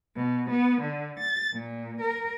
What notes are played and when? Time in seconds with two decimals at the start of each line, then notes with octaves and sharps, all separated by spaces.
0.16 B2
0.50 B3
0.81 D3
1.19 A6
1.52 A#2
2.00 A#4